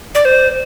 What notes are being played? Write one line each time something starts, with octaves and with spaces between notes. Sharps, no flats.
D5
C5